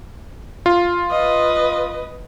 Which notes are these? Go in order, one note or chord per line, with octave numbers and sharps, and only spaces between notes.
F4
B4 D#5